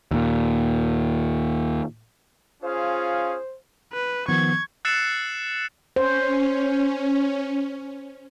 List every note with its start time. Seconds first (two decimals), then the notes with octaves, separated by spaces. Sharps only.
0.11 D#2 A#2
2.63 C#4 F4 G#4 C5 F5
3.93 B4
4.29 D#3 F3 B3 C#6 G#6
4.85 E6 F#6 A6 C7 C#7 E7
5.96 C#4 C5